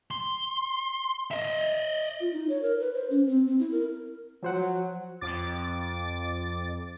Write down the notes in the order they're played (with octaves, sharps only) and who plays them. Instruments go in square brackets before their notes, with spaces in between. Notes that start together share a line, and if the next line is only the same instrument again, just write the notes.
[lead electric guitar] C6
D#5 E5
[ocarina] F4
D#4
C#5
A#4
B4
C5
C#4
C4
C4
E4
A#4
[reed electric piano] F3 C5 F#5 [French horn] F#3
[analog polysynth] F2 D6 A6